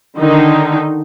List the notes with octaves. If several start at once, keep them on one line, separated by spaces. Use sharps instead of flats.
D3 D#3 D#4